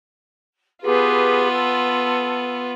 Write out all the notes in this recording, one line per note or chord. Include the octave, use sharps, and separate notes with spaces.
B3 F4 G4 G#4 B4
A4